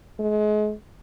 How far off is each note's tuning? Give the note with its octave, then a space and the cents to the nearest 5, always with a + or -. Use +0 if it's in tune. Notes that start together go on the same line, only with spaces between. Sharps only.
G#3 +35